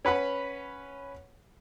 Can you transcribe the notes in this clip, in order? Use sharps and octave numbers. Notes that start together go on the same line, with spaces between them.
C#4 B4 F#5 B5